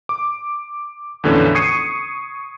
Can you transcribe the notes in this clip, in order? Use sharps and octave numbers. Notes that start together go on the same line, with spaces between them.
D6
E2 A2 D3 E3 F3 C#4
C#6 D#6 G#6 C7 C#7 D#7